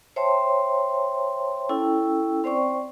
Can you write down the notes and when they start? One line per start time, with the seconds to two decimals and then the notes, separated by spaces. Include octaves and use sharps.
0.16 C5 C#5 E5 G5 A5 C6
1.69 C#4 E4 A4 G5 E6
2.44 C4 C5 D5 G5 C#6